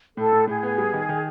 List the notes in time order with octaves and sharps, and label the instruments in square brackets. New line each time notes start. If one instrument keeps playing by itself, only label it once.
[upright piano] A2 [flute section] A4
[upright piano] A2
[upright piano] A2 [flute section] G#4
[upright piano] B3
G3
D#3
D#3